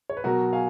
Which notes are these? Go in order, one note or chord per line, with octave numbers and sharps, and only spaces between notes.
C#5
B4
B2 F#3 F#4 A#4
F5 G#5